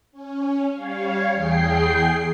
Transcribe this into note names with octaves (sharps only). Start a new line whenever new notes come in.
C#4
G3 C#5 F5
E2 G#4 G5 C7